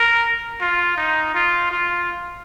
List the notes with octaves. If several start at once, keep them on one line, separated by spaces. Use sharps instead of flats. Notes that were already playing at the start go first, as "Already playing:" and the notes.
Already playing: A#4
F4
D#4
F4
F4